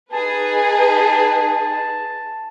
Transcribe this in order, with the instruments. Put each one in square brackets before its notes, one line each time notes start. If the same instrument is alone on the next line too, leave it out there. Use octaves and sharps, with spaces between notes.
[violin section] D#4 G#4 B4 [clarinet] A5